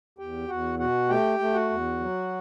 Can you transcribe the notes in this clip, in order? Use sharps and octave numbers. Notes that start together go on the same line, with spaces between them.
E2 G4 G5
E2 F#4 F#5
B2 F#4 F#5
A3 G4 G5
A3
F#4 F#5
E2
F#3